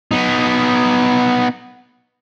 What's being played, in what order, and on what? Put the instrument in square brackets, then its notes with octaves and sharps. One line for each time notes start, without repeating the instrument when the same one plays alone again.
[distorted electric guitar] B3 D#4